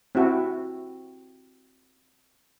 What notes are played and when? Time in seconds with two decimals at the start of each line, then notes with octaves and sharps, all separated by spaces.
0.15 C4 E4 F#4